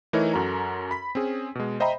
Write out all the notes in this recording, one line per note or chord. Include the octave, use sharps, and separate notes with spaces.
E3 A3 D#4 E4 A#4 C#5
F#2 F#4 A4 A#4 A#5
B5 B6
C4 C#4 G#4
B2 G#3
C5 D#5 E5 G5 A#5 B5